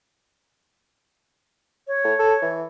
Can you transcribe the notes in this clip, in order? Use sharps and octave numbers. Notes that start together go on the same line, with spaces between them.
C#5
A2
A4
E3